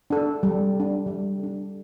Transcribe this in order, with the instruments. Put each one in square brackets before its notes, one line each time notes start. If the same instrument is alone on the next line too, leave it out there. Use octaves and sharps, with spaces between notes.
[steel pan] D4 A4
G3
D4 A4
G3
D4 A4